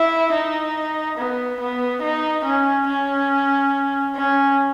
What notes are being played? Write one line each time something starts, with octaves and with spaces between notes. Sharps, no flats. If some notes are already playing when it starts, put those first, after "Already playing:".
Already playing: E4
D#4
B3
B3
D#4
C#4
C#4
C#4